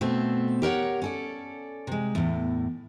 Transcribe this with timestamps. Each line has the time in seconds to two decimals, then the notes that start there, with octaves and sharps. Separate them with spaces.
0.01 B2 A3 C4
0.62 G4 A#4 C#5 F#5
1.02 C#4 A4 D5
1.87 C3 G#3
2.15 E2 A2